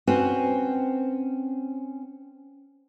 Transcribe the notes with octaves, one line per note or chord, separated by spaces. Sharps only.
C4 C#4 F#4 B4 C5